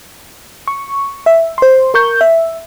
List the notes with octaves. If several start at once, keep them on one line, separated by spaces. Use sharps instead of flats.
C#6
E5
C5 C6
A#4 C#6 G6
E5